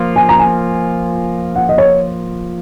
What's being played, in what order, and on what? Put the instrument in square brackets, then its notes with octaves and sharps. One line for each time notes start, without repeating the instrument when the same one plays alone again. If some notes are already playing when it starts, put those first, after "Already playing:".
Already playing: [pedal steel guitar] F3 A#3 F4
[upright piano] G#5
A#5
G#5
F#5
D#5
C#5